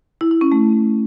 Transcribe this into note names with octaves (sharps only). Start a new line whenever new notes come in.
E4
E4
C#4
A3